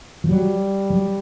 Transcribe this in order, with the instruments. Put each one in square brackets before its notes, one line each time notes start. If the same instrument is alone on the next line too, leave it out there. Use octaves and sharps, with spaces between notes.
[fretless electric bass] F3
[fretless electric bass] F#3 [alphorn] G3
[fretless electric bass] F#3